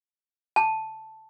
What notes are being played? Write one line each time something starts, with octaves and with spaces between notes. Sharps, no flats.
A5